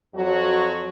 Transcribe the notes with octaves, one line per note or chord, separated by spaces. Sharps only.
F2 F#3 F#4